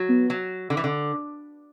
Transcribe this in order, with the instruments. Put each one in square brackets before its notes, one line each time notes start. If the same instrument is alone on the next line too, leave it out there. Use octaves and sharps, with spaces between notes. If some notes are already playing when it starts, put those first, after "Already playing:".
Already playing: [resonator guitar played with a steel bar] F#3
[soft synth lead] B3
[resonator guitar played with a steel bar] F#3
D3
E3
D3